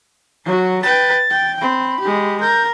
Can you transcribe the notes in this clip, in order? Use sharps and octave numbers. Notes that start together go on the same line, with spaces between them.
F#3 F#4
B4 G5 A6
G5
C4 B5
G#3 G4
A#4 G6